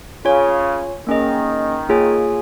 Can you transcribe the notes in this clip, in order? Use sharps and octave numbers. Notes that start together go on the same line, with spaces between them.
C#3 F4 C#5 G#5
D#3 A#3 C#4 G#4 D#5
A#3 F4 G#4 C#5 G#5